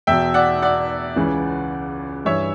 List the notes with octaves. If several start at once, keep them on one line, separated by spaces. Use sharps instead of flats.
E2 B2 E5 G5
D5 F#5
D5 F#5
C#2 C#3 E3
G2 E3 C#5 E5